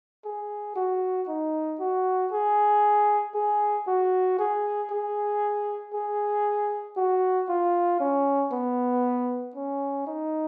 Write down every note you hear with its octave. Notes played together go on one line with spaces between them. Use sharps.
G#4
F#4
D#4
F#4
G#4
G#4
F#4
G#4
G#4
G#4
F#4
F4
C#4
B3
C#4
D#4